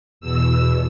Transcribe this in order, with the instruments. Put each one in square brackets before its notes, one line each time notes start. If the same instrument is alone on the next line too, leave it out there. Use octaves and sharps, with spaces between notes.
[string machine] E2 B2 E6